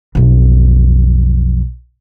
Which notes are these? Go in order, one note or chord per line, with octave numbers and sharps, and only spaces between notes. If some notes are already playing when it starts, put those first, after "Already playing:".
B1 F2